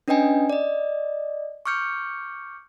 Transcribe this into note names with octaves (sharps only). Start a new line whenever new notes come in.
C#4 D4 B4 D#5 G5 G#5
D5 D#5
C#6 D6 F6 G6 C#7